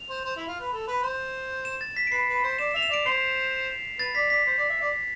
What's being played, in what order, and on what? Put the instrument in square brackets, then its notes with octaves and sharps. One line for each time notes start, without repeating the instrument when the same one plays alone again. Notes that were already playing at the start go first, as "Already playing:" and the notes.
Already playing: [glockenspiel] F7
[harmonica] C5
C5
E4
F4
B4
A4
B4
C5
[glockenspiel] E7
A6
B6
D7
[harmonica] B4 [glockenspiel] C7
[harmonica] B4
C5
[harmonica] D5 [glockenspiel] E7
[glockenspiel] E7
[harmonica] E5 [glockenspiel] F7
[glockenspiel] E7
[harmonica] D5 [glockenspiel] D7
[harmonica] C5 [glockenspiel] C7
[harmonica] B4 [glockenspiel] A6
[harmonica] D5 [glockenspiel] B6
[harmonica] D5 [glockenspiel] B6
[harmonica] C5
D5
E5
D5